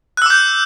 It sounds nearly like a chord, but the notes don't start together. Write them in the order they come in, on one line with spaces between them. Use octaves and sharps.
F#6 E6 D6 G6